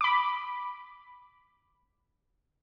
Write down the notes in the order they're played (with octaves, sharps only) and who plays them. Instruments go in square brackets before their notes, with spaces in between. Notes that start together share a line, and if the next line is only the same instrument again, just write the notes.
[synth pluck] B5 D6